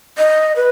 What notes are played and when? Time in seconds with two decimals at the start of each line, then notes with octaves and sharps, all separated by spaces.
0.18 D#5
0.56 B4